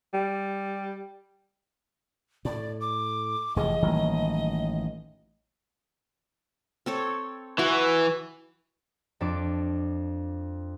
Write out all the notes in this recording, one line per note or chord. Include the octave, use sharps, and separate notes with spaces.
G3
A2 D5
D6
F1 F2 E3 G#4 D#5
A1 D#3 E3 F#3 G3 A#3
C4 A4 C#5
E3 F#4
F2 D4 D6